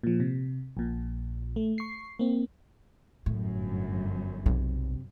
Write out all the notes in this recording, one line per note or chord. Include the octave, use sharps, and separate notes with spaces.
A#2 F3
C3
A#1 A#2
A3
C#6 C7
A#3 C4
G1 F#2 A2
B1 C3